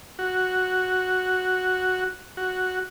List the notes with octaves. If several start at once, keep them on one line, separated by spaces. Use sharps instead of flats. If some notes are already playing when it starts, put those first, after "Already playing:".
F#4
F#4